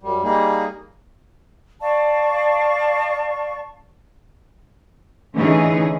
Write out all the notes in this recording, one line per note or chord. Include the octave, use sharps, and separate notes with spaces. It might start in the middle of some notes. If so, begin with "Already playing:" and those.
F#2 G3
G3 A#3 D#4 G#4
D5 F5 A5 C#6
D3 E3 A3 C#4 D#4 G#4